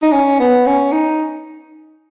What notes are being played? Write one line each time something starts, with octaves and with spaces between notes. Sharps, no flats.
D#4
C#4
B3
C#4
D#4